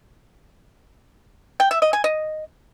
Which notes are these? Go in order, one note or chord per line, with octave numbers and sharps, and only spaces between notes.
G5
E5
D#5
G#5
D#5